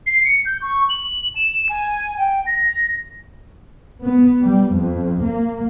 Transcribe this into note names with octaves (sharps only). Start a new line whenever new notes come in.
C7
C#7
G6
C#6
F#7
E7
G#5
G5
A#6
B3
G3
F2
A#3